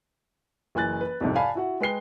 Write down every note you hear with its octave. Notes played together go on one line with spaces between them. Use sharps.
F#1 E3 G#5 F#6 A6
B4
C2 F2 G#2 C3
D5 F5 G#5 A5 B5
E4 F#4 F#5
G#3 B4 G5 C7 G7